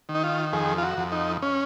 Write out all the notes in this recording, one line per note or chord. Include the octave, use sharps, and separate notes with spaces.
D#3
D#4
F4
F2 G#4
F4
F#4
F2
D#4
C#4